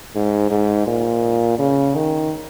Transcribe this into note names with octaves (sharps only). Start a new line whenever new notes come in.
G#2
G#2
A#2
C#3
D#3